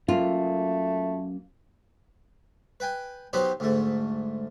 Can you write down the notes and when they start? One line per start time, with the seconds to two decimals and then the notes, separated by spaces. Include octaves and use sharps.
0.08 F#2 A3 A#3 F4
2.80 B4 G5 G#5
3.33 F#3 B3 D#4 G4 B4 C5
3.60 D2 G#2 A3